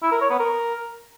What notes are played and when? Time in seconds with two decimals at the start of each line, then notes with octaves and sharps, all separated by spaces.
0.02 E4
0.11 A#4
0.21 C#5
0.30 B3
0.39 A#4